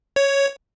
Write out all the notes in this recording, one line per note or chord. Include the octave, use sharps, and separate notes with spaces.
C#5